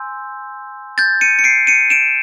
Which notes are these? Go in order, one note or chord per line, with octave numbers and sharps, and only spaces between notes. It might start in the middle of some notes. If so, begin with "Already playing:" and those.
Already playing: G#5 C6 E6 G6
G6 A6
C#7 D#7
C#7
C7 D7
C#7 D#7
D7 E7